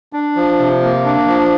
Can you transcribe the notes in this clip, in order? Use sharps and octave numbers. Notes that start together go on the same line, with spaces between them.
D4
F3
C3
A#3
D4
F3